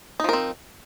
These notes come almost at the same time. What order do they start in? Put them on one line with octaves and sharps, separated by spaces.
D#4 F3 A#4 C4